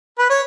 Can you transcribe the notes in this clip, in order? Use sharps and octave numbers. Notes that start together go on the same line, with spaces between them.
B4
C#5